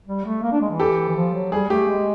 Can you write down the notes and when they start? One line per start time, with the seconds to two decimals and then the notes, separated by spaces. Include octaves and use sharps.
0.07 G3
0.25 A3
0.43 A#3
0.52 D4
0.61 G#3
0.70 E3
0.79 G4 A4
1.09 E3
1.16 F3
1.34 F#3
1.52 G3 G#4
1.70 A3 G4
1.88 G#3